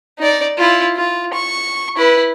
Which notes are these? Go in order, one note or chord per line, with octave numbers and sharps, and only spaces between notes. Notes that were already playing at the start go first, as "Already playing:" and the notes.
D#4 D5
E4 F4
F4
C#6
E4 B4